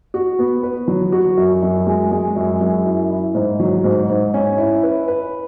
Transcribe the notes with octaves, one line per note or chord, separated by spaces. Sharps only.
F#4
B3
B4
F#3
F#4
F#2
F#2
G#3
G#3
F#2
F#2
E4
E4
G#2
F#3
G#2
G#2
C#4
E4
B4
B4